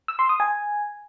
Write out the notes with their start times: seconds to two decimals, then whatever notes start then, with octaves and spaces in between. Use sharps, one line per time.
0.08 E6
0.19 C6
0.29 D#6
0.40 G#5